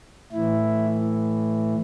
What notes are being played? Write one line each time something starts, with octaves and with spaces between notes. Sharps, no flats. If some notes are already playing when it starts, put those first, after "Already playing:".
A2 E3 E4